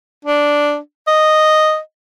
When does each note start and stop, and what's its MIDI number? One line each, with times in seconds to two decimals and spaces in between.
0.25 0.77 62
1.07 1.79 75